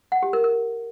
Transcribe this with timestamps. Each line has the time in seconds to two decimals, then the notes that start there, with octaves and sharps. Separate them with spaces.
0.12 F#5
0.23 G4
0.33 A#4
0.44 A#4